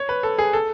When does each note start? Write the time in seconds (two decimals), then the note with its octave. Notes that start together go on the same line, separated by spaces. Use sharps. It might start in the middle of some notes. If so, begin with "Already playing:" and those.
Already playing: C#5
0.09 B4
0.23 A4
0.38 G#4
0.53 A4